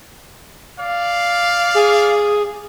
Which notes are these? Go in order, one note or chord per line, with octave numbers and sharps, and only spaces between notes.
D5 F5
G#4